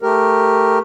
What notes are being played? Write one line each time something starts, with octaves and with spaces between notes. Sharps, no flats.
A3 G4 A#4